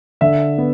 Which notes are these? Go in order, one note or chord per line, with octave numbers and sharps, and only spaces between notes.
D3 E5
B3